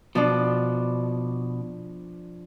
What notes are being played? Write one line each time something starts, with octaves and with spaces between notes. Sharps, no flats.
B2 F3 D4